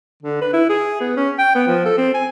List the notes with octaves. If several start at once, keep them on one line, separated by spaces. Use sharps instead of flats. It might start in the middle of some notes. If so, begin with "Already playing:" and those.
D3
B4
E4
G#4
B3
C#4
G5
B3
F3
A4
C4
G#5